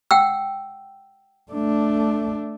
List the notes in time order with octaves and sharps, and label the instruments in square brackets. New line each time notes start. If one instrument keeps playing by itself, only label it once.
[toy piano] F#5 G5 E6
[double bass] A3 D4